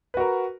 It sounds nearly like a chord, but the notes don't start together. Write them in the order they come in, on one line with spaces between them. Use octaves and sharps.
B4 F#4 A#4